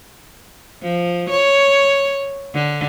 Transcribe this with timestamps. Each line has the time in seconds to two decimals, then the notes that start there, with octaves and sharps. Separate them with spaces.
0.83 F3
1.30 C#5
2.55 D3